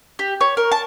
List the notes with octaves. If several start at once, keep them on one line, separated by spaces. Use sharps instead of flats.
G4
C#5
A#4
A5